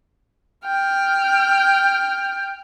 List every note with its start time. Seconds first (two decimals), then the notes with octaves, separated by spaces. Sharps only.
0.65 G5 F6